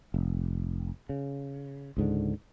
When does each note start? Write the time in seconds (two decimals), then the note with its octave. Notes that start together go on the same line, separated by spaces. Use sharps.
0.14 F1
1.09 C#3
1.97 C#2 G#2 D3